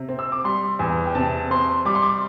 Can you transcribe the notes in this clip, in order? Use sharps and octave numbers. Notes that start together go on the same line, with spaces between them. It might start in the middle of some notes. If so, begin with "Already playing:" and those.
Already playing: C3
C4
E6
D6
G3 C6
E2
G5
C3 A5
C4 C6
G3 D6
C6
D6